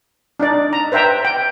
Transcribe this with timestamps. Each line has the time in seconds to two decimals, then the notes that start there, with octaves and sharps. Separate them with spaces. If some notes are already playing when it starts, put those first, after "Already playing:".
0.40 D4 D#4 D5
0.73 A#5
0.92 B4 C5 E5 G5 A#5
1.25 G5